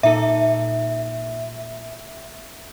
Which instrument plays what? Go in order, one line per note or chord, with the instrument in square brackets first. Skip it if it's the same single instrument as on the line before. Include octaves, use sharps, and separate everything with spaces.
[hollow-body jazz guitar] A#2 D#4 A4 [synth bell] E5